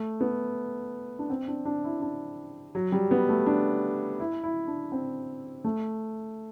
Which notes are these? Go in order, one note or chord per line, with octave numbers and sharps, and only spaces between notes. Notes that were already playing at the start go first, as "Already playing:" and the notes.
Already playing: A3
B3
D4
C4
D4
D4
E4
D4
F#3
G3
B3
A3
D4
E4
E4
D4
C4
A3